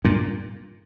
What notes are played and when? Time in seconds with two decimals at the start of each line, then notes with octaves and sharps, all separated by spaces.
0.04 G2 A#2